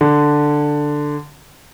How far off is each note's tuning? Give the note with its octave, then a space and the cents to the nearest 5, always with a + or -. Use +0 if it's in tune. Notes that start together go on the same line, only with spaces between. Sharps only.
D3 +5